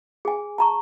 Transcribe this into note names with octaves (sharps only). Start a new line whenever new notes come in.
G#4 G#5
A5 A#5 C#6